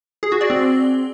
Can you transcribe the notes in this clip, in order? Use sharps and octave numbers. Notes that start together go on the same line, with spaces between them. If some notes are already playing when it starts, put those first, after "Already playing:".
G#4
F#4
D5
C4